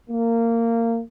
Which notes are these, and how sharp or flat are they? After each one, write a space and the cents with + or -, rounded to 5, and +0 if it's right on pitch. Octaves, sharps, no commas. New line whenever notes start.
A#3 -20